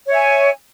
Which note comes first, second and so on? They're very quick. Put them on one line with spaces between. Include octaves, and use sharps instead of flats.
C#5 E5 G#5